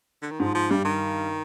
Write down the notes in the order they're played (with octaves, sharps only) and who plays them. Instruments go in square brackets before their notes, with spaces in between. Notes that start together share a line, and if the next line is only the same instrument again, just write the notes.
[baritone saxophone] D3
D#3
[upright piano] G#2 [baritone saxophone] F3
[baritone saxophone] F3
[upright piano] G2 [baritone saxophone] G3
[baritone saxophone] D#3